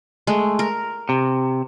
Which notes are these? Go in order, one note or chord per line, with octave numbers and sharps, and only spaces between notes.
G#3 A3
A#4
C3